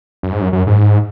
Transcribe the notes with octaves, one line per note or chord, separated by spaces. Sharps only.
F#2
G#2
F#2
F#2
G#2